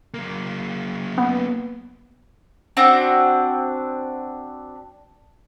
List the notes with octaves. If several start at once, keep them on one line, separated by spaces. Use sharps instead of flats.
F#3 A#3
B3
C4 D4 F#4